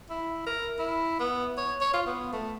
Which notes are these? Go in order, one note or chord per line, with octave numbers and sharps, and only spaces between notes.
E4
A#4
E4
B3
C#5
C#5
F4
B3
A3